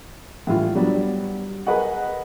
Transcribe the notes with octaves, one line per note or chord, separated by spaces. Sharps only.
A2 E3 G3 F4
F#3 G3 B3 D4
G#4 A#4 B4 D#5 F#5